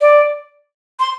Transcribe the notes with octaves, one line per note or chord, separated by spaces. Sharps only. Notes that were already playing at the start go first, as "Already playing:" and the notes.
D5
C6